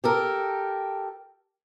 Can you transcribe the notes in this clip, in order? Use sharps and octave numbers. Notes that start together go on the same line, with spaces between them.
G4 A4 A#4